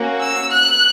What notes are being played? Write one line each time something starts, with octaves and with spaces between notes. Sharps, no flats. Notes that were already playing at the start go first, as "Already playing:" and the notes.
Already playing: A#3 C#4 F#4
E6
F#6